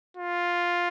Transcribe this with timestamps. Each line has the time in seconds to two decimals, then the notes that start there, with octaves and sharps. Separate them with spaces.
0.17 F4